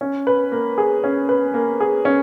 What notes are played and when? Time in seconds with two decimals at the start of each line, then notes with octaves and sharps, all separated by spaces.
0.01 C#4
0.27 B4
0.52 A#3
0.78 G#4
1.04 C#4
1.29 B4
1.54 A#3
1.80 G#4
2.05 C#4